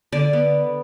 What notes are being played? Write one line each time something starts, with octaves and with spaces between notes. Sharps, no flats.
D3 D5
B3